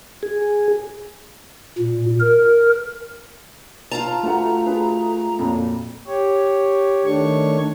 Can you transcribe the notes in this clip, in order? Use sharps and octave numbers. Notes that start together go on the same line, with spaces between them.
G#4
A#2
A#4
F4 F5 A5 A#5
A3 F#4 B4 F#5
F#4 G#4 B4
F2 A#2 F#3
G4 C#5
D#3 A3 D4 C#5 C#6